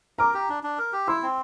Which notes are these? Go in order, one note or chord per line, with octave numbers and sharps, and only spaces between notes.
A#4 A#5 D6
G4
D4
D4
A#4
G4
E4 C6 E6
C4